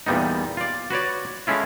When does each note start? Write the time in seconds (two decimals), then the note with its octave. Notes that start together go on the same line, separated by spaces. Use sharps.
0.06 E2 A#2 G3 B3 D#4
0.57 F4 D5
0.90 F#4 B4 C#5 D5
1.47 G#3 A3 C#4 E4 F4